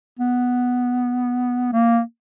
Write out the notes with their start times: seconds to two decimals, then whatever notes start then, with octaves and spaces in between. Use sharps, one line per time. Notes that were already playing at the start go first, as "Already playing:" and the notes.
0.19 B3
1.73 A#3